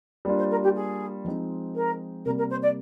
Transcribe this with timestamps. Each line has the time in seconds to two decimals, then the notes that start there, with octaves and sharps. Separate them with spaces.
0.25 G3 A#3 D4 F4
0.38 C5
0.50 A#4
0.63 G4
0.75 G#4
1.25 F3 G#3 C4 D#4
1.75 A#4
2.25 C3 G3 A#3 A#4
2.38 A#4
2.50 C5
2.62 D5